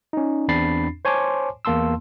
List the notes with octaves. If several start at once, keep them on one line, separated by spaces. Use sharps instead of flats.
C#4 D#4
E2 C4 D4 B5 A6 C7
C5 C#5 G#5 A5 C6 D6
E2 A#3 A5 C6 E6